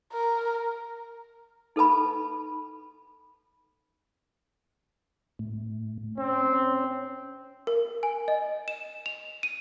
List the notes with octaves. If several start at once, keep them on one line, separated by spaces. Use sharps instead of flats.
A#4
D#4 A4 B4 A5 B5
A2
C4 C#4
A#4
G#5
D#5
E7
F7
D#7